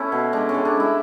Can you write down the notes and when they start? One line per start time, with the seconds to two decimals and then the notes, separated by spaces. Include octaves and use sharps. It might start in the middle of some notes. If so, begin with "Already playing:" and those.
Already playing: A3 C#4 E4
0.12 B2
0.33 G#3 D4
0.49 C#4
0.54 A2
0.65 D4
0.75 G#3 E4